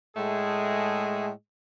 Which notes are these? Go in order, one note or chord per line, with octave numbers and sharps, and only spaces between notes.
A2 G#3 A3 G#4